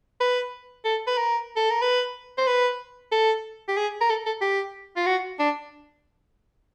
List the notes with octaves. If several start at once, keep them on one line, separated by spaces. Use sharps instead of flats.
B4
A4
B4
A#4
A4
A#4
B4
C5
B4
A4
G4
G#4
A#4
A4
A4
G4
F4
F#4
D4